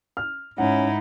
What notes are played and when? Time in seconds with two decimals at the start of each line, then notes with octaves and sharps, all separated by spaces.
0.17 F6
0.58 G#2 C#4 D#4 E4 F#5